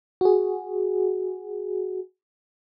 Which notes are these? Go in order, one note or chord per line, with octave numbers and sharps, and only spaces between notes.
F#4 G#4